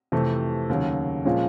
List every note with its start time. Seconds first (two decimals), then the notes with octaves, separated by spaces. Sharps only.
0.12 F2 C3 E3 A3
0.69 D#2 C#3 F#3
1.25 A#2 F3 G#3 C#4